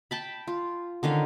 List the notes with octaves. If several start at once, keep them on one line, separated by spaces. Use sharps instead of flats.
G5 A5 B5
F4
D3 D#3 C#4 F5